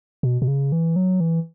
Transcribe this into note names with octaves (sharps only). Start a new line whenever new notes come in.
B2
B2
C#3
E3
F#3
E3